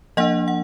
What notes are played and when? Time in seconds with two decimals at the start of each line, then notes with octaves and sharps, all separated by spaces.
0.17 F3 A#3 D4 D#5 F#5
0.48 F#5